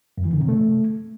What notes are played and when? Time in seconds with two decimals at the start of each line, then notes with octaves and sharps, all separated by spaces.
0.18 F#2
0.25 E3
0.33 D3
0.41 C3
0.48 A3